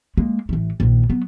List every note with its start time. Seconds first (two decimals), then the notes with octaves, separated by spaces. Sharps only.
0.17 G#3 A#3
0.49 A1 E3
0.80 A#1 D#3
1.10 F#3 B3